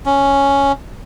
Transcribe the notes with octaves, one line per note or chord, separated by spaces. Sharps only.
C#4